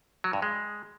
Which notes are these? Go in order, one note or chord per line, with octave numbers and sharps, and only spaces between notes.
F#3
G2
G#3